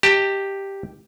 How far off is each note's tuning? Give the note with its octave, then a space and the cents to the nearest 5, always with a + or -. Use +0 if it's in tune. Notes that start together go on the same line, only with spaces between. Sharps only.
G4 +0 D#5 +10 A5 +35